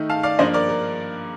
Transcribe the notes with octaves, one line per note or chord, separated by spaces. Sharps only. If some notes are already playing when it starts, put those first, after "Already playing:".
Already playing: D#3 A3 D#4
F5 A5
D5 F5
G2 F3 A#3 D4 C5 D#5
A#4 D5
A#4